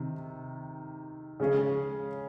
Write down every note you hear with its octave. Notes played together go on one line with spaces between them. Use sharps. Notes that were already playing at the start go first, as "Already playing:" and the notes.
Already playing: C3 D#3
C#3 G#3 C#4 G#4